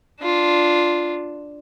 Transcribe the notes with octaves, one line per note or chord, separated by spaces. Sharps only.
D4 F4